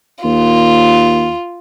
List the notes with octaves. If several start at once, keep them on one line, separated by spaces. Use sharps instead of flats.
D#2 F4